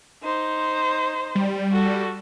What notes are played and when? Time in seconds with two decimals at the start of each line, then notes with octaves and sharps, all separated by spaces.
0.24 D#4 C5
1.35 G3
1.72 F#4 A4